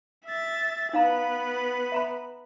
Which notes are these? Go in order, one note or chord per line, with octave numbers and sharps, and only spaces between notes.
E5 A6
B3 D#4 B4 F5 A#5
E5 A#5 B5